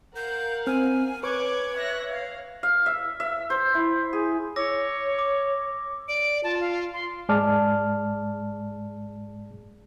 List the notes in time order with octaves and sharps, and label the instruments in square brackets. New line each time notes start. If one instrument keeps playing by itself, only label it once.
[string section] A#4 F5 F#5 [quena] G6
[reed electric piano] C4 F6 [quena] G#5
[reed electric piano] B4 C#6 [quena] C#5 [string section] D6 F#6 G#6
[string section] E5 F#6 A#6
F5
[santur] F5
E5
E5
C5
E4
G#4
[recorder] C#5 [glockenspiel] D6 E6 A#6
[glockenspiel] D6
[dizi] D5 [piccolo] D7
[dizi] F4 [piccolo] A5
[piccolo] F5
C6
[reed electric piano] G#2 G#3 G#4 D5 A5 F6